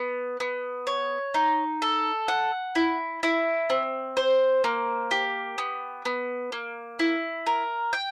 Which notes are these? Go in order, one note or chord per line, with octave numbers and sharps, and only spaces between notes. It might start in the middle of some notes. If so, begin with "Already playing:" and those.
Already playing: B3
B3
C#5
D#4
A4
F#5
E4
E4
C4
C5
A#3
G4
B3
B3
A#3
E4
A#4
G5